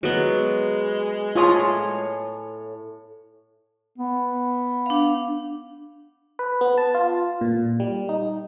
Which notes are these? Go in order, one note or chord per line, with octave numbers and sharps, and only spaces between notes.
F#3 G#3 B3
A2 F4 C#5 G#5 D#6
B3
D4 F5
B4
B3
A5
F4
A#2
G3
D#4